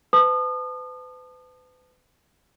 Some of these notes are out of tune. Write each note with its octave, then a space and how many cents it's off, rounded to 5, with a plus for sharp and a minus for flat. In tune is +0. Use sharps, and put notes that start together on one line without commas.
B4 +40 A5 +0 D#6 -35